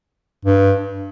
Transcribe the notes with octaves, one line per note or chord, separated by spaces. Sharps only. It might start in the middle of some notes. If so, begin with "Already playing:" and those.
G2